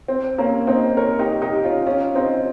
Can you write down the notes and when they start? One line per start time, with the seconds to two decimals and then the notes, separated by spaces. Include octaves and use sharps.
0.08 C4
0.38 A#3 C#4
0.67 C4 D#4
0.97 A#4 C#5
1.19 D#4 G4
1.42 D#4 G4
1.64 C#4 F4
1.86 C#4 F4
2.15 C4 D#4